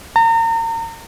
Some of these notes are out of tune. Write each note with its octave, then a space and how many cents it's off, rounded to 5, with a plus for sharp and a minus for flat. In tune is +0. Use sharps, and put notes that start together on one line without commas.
A#5 -35